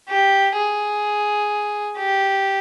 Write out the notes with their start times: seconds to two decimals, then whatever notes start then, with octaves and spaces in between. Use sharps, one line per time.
0.09 G4
0.56 G#4
1.98 G4